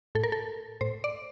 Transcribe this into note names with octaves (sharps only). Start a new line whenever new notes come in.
A2 A4
A#4
A4
A2 C5
D5